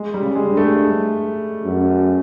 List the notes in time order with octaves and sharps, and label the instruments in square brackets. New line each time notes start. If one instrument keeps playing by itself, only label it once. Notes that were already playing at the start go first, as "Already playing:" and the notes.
Already playing: [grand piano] G#3
G3
[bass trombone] C#3
[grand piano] G#3
[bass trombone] G2
[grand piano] A3
[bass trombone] F#2